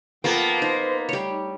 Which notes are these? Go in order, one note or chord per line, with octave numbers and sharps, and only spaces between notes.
F3 A#3 B3 A4 G5 A5
D#4 C5
G3 A3 D#4 C#5